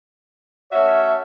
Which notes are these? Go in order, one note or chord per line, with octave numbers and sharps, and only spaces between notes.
A3 C#4 F#4 C#5 E5